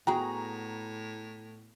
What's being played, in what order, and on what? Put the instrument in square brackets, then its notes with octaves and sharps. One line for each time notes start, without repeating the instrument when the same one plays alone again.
[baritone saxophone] A2 [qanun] B3 F#4 G#4 [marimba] G5 [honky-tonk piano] A#5